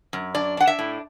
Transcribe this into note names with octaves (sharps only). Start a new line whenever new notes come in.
F#2
D4 D5
D4 F#5
E5
A2